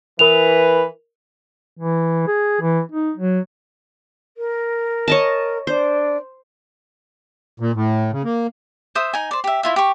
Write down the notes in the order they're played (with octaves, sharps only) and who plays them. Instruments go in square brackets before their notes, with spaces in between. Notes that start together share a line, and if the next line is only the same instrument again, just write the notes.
[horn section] E3 B4 [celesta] A#4 F7
[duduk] E3
G#4
E3
D#4
F#3
[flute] A#4
[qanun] C#5 D#5 A5
[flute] D4 [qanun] C5
[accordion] A#2
A2
C#3
A#3
[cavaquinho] C5 E5 D#6
D#4 G#5
C5 D5
G4 E5
E4 F4 E5
G4 C#6